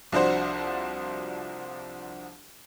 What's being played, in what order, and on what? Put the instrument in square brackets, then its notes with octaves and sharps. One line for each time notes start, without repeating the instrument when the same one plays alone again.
[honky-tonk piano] C2 F3 D4 F#4 C5